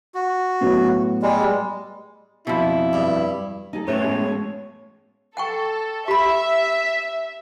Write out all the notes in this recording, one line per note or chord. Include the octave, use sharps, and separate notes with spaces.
F#4
A2 F#3 B3
G3 G#3
F2 B2 E4
G2
D#4 G#4 A4
A2 C#4 G4 A4 B4 C#5 E5
G#3 B3 G#4
A4 F#5 G5 C#6
G4 E5 B5